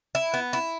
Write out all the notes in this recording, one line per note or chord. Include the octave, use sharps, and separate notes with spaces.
E4
B3
E4